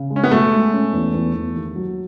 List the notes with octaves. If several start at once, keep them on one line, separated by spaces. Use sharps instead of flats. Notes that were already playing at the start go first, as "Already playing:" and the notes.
Already playing: C#3
G#3
C#4
B3
B2 A3
G#3
C#4
E2
E2
E2
D#2
F#3